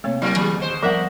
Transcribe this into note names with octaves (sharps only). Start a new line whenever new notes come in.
C3 A3 A#3 C4 C#5
F#3 G3 A#3 E4
D3 E3 F#3 B3 G#4 B5
D#2 B2 C5
F3 G3 B3 A#4 E5 F#5